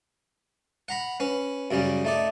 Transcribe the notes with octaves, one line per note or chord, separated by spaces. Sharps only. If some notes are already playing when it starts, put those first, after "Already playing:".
F#5 A#5 B5
C#4 B4
F#2 C#3 G3 C#4
A3 D#4 D5